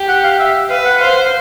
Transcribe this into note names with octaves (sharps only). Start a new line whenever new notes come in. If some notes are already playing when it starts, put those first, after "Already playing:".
Already playing: G4
F#5
F5
E5
B4 F5
F#5
C5 F5